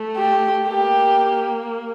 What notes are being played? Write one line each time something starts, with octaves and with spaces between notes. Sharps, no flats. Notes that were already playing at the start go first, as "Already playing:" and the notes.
Already playing: A3
G4
A#3 G4